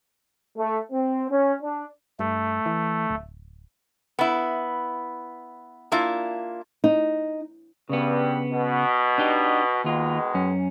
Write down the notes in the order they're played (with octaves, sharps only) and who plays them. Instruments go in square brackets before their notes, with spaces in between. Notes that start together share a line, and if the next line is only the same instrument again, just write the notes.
[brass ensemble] A3
C4
C#4
D4
[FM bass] G2 [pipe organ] A3
[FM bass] E3
D1
[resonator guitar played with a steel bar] B3 E4
A#3 D4 E4 F4
[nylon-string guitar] D#4
[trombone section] G2 [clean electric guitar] C#3 B3
[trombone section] B2
[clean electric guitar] D4 D#4 G4
[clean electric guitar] D#2 F4 [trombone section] B2 D#3 G#3
[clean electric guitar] F#2 C#4